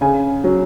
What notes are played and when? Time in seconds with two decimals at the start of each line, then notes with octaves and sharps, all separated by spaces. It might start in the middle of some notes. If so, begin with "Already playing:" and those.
0.01 C#3 G#5
0.44 F#3